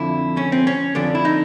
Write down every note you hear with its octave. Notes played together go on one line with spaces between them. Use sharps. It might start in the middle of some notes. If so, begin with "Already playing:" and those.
Already playing: F2 D3 E4
C#4
C4
C#4
F2 D3 D4
E4
D#4